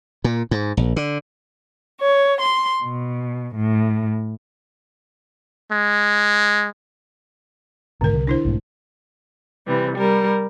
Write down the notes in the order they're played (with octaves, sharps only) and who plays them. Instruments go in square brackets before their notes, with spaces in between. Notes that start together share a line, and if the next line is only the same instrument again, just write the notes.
[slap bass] A#2
G#2
A#1
D3
[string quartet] C#5
C6
B2
A2
[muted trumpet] G#3
[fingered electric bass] B1 G#2 D#3 [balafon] D3 A#4
[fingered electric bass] C2
[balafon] D4 E4 C5
[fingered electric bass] B1 G#2 A3
[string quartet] C3 E3 G3
G3 A#4